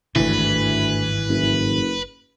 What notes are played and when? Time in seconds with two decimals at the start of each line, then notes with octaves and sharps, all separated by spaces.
0.16 G#1 D2 G2 E3 B4
1.29 F#1